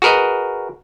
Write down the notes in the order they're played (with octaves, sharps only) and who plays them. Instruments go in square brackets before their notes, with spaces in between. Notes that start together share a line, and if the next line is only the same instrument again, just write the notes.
[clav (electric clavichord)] F#4 G#4 A#4 B4 D#5